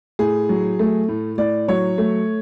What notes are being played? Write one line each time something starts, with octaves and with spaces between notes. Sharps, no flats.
A2 G#4
F#3
A3
A2
A2 D5
F#3 C#5
A3